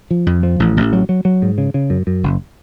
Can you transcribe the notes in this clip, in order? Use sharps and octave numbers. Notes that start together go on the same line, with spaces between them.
F3
F2
F3
A1
A1
F#3
F#3
F#3
G#2
C#3
C#3
F#2
F#2
F#1